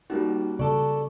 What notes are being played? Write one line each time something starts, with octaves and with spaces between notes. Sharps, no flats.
G3 A#3 C#4 D#4 F#4
C#3 A4 D5 C#6